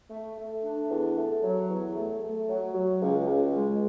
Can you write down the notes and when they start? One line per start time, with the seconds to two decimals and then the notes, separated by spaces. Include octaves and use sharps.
0.10 A3
0.36 A3
0.62 D4
0.89 E2
1.16 A3
1.42 F#3
1.69 E2
1.95 A3
2.22 A3
2.48 F#3
2.74 F#3
3.02 C#2
3.27 C#2
3.54 G#3